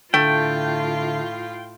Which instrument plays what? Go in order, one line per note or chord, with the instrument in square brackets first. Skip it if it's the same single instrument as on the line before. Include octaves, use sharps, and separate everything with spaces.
[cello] A2 F4 [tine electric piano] D3 [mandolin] A3 [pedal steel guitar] G5